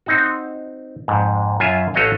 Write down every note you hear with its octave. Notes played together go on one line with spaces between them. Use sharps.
C4 D#4 F#4
F2 G#2
F#2 F4 E5 G#5
A1 A3 F#4 C#5 D#5 F5